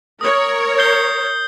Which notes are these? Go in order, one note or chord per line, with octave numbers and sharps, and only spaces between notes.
A#4 C#5 D#6
G6 C7 G7